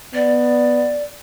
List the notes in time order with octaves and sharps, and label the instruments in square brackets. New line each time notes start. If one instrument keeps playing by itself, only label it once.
[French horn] B3 [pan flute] D5